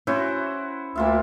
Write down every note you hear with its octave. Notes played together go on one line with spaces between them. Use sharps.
C#4 E4 F#4 C5
D2 A#3 F4 E5